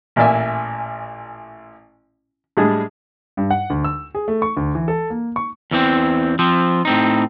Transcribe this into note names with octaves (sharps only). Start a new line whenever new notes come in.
A1 A#2 A#4 D5 E5 G#5
A2 G3 G#3 D4 G#4
G2
F#5
D2
E6
G#4
A3
C#6
D2
E3
A4
A#3
C#6
E2 E3 C4
F3 C4
A2 C4 D#4